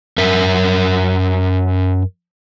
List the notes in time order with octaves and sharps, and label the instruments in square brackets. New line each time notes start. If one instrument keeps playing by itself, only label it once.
[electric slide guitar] F#2 A#4 E5